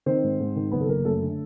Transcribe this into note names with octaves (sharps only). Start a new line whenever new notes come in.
D#3 C4 C5
G#2
G#2
D#3
F#1 B3 B4
A4
F#1 A#3 A#4
F#2 A3 A4
D3